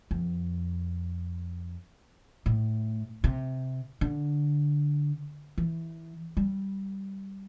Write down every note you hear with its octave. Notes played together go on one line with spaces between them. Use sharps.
F2
A2
C3
D3
E3
G3